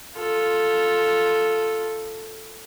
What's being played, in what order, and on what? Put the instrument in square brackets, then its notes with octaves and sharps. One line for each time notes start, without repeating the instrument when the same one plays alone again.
[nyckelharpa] F4 A4